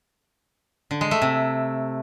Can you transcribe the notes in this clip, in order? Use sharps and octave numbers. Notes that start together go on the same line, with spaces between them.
D3
G#3
A3
C3